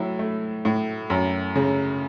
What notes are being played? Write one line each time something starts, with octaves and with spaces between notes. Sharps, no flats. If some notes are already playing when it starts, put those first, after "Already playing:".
Already playing: A2 F#3 E4
A3
A2
F#2
C#3